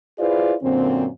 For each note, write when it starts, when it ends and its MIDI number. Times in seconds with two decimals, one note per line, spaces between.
0.19 0.54 64
0.19 0.54 65
0.19 0.54 68
0.19 0.54 71
0.19 0.54 72
0.19 0.54 74
0.62 1.06 42
0.62 1.06 46
0.62 1.06 50
0.62 1.06 60